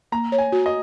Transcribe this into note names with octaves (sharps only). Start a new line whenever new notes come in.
A#3 A#5
C#5
G#5
F#4
D#5